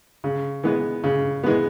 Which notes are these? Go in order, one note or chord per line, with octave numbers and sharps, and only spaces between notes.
C#3
E3 G#3 B3
C#3
E3 G#3 B3